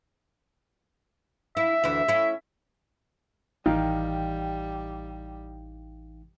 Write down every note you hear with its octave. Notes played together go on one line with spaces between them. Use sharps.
E4 E5
D2 E3 E4
C#4 E4
A1 D#3 E3 G3 D#4 F5 G5